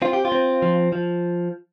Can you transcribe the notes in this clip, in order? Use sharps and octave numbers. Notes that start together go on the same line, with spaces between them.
C4 F4
G4
F4
C4
F3
F3